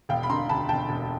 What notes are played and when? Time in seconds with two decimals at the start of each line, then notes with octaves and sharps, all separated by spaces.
0.09 E1 F5 G5
0.23 B5
0.29 D3 A#5 C6
0.49 D2 A5 B5
0.69 E1 G5 A5
0.89 E1